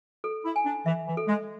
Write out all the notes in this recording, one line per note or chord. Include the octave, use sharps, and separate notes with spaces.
A4
E4
G#5
D4
E3 E5
E3
A4
G#3